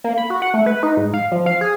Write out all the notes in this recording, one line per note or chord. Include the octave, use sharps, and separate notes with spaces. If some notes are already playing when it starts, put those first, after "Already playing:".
A#3
B5
F#4
F#5
A3
B4
D#4
G#2
F5
F3
F5
G#4